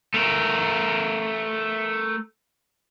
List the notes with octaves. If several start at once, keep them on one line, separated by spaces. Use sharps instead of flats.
A3 A#4